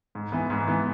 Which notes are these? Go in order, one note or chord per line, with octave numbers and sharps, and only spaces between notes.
G#2
E3 B3
G#2
E3 B3